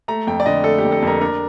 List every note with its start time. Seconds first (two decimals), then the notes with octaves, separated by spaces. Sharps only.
0.08 A3 A#5
0.27 F2 G5
0.40 D5
0.46 D3 D#5
0.64 A3 A4
0.78 G4
0.84 F2
0.92 A4
1.02 F2 A#4
1.21 D4 A#4